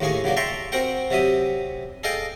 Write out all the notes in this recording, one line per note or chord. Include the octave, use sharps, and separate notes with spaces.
D#2 A2 A#3 G#4 C#6
C#3 F#3 A#3 D4
E5 G5 A5 A#5 C6 C#6
C4 F#4 A#4 F#5 G5
C3 F#3 E5 D#6
G#4 A4 D#5 F5 G5